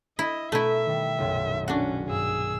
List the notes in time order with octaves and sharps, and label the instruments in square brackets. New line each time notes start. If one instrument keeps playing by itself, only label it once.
[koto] E4 [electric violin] D#5 [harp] E5
[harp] B2 A#4 D#7 [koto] A3 E4 [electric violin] E5
[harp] D#3 G3
F#1 B1 A#2
[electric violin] C#4 [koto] D4 F#4
[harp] G2 [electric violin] G#4 E6